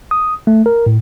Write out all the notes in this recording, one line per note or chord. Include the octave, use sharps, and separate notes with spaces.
D#6
A3
A#4
A2